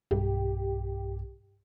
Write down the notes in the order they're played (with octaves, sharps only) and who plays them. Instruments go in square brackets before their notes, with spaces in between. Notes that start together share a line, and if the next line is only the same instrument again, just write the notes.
[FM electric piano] B1 [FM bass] G2 [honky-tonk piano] G4